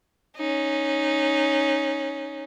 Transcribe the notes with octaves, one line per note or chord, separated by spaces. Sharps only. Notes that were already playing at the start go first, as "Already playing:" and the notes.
C#4 D#4